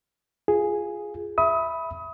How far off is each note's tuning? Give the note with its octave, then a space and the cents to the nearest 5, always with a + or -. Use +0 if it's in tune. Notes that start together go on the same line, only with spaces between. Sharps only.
F4 +0 G#4 +0
E5 +0 B5 +0 D#6 +30